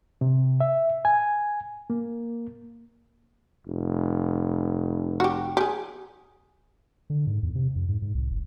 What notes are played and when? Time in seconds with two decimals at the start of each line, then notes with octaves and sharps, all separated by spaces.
0.21 C3
0.60 E5
1.05 G#5
1.90 A#3
3.67 F1
5.20 F#4 G4
5.57 G4 G#4
7.10 D3
7.27 G#2
7.43 E2
7.55 C3
7.76 F2
7.88 G#2
8.02 G#2
8.15 C2
8.31 F#1